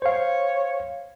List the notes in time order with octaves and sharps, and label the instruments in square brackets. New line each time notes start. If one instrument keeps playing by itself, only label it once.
[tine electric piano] C5 F5 [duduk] C#5